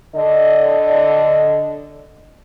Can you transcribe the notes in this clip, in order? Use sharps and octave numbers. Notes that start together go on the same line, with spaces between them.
D3 D#5